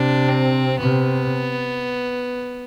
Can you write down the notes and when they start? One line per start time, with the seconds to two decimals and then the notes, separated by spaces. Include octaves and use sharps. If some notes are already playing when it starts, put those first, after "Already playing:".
Already playing: C3 D4
0.29 C4
0.80 C3 B3